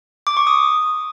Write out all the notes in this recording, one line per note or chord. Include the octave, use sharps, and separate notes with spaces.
D6
C#6
D#6